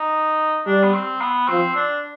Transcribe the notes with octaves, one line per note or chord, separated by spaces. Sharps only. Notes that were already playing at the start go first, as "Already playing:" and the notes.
Already playing: D#4
G3 D4
B3
C4
B3
F3 C4
D4